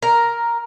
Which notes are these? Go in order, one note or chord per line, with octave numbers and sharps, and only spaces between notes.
A#4